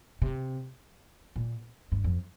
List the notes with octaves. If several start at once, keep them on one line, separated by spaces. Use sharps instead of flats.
C3
A#2
G2
F2